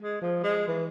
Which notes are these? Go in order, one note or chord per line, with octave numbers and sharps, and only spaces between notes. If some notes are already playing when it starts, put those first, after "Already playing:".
G#3
F3
G#3
E3